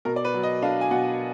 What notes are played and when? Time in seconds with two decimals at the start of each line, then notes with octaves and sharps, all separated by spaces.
0.05 B2 A#4
0.16 D5
0.25 B4
0.34 F#3
0.43 D#5
0.62 D4 F5
0.81 G#5
0.91 B2 F#5